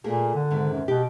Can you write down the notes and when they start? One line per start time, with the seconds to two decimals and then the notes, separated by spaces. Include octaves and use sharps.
0.04 A#2 A3 A#3 G#4
0.35 D3
0.51 G#2 C3 D#3
0.72 F#2
0.88 B2 G4